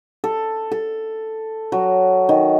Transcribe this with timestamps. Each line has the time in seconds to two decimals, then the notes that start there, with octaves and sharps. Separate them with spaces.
0.24 A4
0.72 A4
1.72 F#3
2.29 D#3